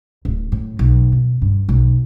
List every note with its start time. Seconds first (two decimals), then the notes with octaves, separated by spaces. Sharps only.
0.25 D1
0.52 A2
0.79 B1
1.12 B2
1.42 G2
1.69 B1